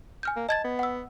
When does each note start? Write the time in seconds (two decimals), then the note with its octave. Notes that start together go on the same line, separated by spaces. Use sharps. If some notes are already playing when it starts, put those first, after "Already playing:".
0.23 G#5 F6 G6
0.36 A#3
0.49 D#5 A5 G#6 A6
0.64 B3
0.79 F#5 E6